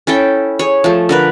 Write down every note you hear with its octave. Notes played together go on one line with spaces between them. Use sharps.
C#4 E4 A4 G5
G#4 C#5
F3 A3
D3 A#4 B4